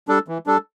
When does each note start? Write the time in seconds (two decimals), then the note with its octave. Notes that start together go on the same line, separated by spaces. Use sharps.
0.08 G3 D4 A4
0.28 E3
0.47 G3 D4 A4